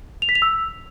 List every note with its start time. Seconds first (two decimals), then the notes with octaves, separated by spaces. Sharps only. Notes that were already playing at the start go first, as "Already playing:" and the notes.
0.22 F7
0.29 B6
0.35 F7
0.42 E6